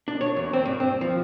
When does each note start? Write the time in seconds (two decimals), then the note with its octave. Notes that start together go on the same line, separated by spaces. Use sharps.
0.08 D4
0.21 C#5
0.36 E2
0.53 C4
0.65 G2
0.80 C4
1.01 F3